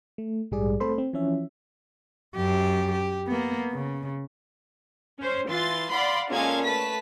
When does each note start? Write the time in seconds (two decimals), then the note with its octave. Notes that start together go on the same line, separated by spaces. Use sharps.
0.18 A3
0.51 A#1 G#2 G3 G#4 D5
0.80 A3 C4 A4 C5 B5 C6
0.98 C4
1.13 E3 F3 C#4 E5
2.37 F#2 G4
2.92 G4
3.27 A#3 B3
3.72 C#3
5.19 C#4 C5
5.48 E3 F4 C6 A6
5.89 D5 F5 F#5 B5 C6
6.30 A#2 G#3 C#4 A4 F5 G#6
6.66 A3 B4 A5 B6